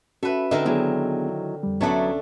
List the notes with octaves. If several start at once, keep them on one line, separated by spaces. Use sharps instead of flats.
C#4 F#4 A4 B4 E5
D3 C4 D#4 A#4 B4 E5
D#3 F#3 B3 D4 E4 G#4
F2 G3
C2 F#3 A3 B3 C#4 D4 E5 A5